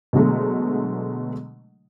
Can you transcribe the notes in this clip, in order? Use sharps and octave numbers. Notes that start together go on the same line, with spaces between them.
B2 D3 F#3 G#3 A3